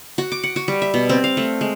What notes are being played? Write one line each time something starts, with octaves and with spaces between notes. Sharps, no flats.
F#4
D6
F#5
F#4
G3
E5
B2
C4
F5
A3
G#3